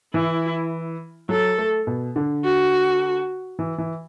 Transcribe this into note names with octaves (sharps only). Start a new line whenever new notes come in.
E3 E4
F#3 A4
A3
B2
D3
F#4
E3
E3